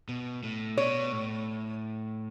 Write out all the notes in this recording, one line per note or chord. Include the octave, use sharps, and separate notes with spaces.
B2
A2
B2 C#5
A2